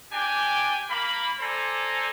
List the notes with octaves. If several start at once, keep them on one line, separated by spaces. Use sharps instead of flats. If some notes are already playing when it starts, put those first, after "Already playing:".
D4 G4 G5 G#5
A#3 B5
A4 C5 D5 G#5 A#5